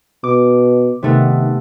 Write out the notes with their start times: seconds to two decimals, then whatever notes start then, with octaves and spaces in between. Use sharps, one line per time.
0.24 B2 D6
1.03 C3 D#3 A3 B3